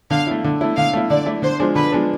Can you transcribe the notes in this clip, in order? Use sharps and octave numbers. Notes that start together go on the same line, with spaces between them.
D3 F5
A3 E4
D3
A3 E4
D3 F5
A3 E4
D3 D5
A3 E4
D3 C5
F3 G#3 D4
D3 B4
F3 G#3 D4